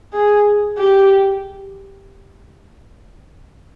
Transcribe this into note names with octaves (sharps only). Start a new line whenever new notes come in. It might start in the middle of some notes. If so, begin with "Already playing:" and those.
G#4
G4